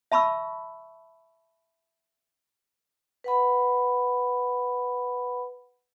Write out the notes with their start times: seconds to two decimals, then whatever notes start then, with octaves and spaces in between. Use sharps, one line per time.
0.12 E5 A5 B5 C#6 E6
3.24 B4 F#5 B5